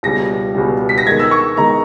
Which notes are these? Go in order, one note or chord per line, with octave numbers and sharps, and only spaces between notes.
C#2 B2 G3 A#6
C#2 B2 G3
B6
A#6
D#3 G#3 B3 G#6
E6
C#6
D#3 G#3 B3 A#5